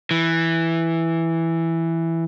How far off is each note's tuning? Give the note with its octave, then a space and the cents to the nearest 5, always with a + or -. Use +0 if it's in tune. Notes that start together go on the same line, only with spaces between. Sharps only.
E3 +0